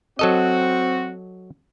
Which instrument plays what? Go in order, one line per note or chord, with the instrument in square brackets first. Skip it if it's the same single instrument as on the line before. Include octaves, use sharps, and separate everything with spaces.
[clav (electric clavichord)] F#3 A4 D#5 [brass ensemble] C4 F#4